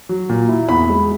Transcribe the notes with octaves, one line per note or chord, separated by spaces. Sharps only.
F#3
A#2
E4
E2 B5
G#3